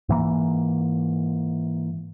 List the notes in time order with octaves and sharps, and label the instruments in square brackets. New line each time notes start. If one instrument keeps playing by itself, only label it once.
[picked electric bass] G#2 E3 A#3